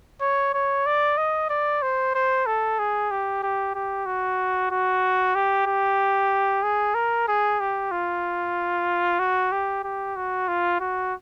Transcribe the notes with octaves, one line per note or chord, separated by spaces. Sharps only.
C#5
C#5
D5
D#5
D5
C5
C5
A4
G#4
G4
G4
G4
F#4
F#4
G4
G4
G#4
A#4
G#4
G4
F4
F#4
G4
G4
F#4
F4
F#4